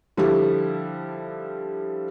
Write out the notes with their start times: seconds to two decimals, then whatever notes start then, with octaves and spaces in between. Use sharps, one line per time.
0.17 D3 F3 G3 E4 G4